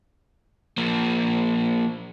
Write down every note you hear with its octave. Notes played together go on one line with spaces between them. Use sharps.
F3 A#3